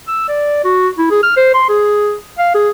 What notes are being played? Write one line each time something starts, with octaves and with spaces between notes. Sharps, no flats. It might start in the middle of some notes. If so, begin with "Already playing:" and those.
E6
D5
F#4
E4
G#4
F6
C5
C6
G#4
F5
G#4